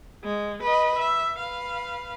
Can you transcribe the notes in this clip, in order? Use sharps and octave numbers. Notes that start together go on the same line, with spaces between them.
G#3
B4 D#5
E5
B4 F5